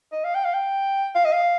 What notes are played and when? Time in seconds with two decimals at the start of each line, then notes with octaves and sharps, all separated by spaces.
0.12 D#5
0.24 F5
0.35 G5
0.45 F5
0.54 G5
1.15 F5
1.25 D#5
1.32 F5